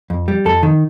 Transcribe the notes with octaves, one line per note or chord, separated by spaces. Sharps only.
F2
G3
F2 A4
D#3